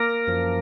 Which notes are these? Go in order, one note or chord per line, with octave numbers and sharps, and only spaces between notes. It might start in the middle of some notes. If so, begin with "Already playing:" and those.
Already playing: A#3 A#4
F#2 F3